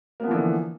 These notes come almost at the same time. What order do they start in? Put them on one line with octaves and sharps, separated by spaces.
A#3 B3 F3 E3 D3